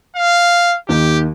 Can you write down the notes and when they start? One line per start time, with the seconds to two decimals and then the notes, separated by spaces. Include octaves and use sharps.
0.16 F5
0.89 D#2 D#3 G4